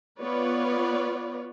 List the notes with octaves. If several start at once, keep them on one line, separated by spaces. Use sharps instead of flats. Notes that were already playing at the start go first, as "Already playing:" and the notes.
B3 F4 B4 C#5 D5